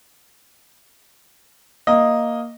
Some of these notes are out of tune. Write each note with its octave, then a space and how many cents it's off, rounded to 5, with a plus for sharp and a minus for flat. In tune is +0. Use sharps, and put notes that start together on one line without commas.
A#3 +0 D#5 +0